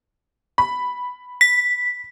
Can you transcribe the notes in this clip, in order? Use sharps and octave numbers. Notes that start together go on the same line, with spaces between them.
B5
B6